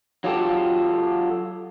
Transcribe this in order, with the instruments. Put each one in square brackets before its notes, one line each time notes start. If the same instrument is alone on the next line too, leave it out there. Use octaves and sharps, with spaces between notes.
[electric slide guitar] F#3 F4 G4 A4